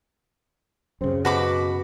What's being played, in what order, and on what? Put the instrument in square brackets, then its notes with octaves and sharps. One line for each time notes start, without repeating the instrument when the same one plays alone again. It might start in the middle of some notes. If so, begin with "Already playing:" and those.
[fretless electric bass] F#2 C#3 [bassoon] C4
[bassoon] B2 [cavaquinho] F#4 B5 D6